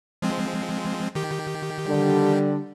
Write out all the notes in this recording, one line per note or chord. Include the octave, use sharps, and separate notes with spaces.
F3 G#3 C4
D#3 G4
D3 G3